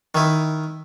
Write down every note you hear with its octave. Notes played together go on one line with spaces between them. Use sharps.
D#3 E4